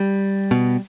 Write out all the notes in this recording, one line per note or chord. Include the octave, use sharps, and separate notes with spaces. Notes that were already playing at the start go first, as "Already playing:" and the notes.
Already playing: G3
B2